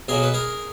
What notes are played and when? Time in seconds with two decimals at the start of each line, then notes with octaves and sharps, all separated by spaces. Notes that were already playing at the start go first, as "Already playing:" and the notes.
0.08 B1 B2 F#3 G#4 A#4
0.23 B4
0.34 G#4 A#4